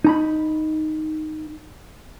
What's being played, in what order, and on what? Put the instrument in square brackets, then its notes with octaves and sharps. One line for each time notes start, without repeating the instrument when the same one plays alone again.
[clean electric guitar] D#4 A#5 B5